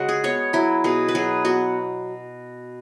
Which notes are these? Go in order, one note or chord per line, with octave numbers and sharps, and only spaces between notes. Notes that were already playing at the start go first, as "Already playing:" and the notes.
Already playing: C#3 G#3 F#4
G#4
B3 C#5
F#3 E4
B2 G#4
B4
F#3 G#4
B3 F#4